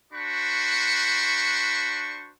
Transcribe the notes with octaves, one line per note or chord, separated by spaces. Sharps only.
D4 F#4 C5 B5 C#6